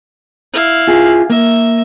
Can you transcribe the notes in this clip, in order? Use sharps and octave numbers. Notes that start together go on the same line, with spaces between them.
E4 F5
F4 G#4
A#3 E5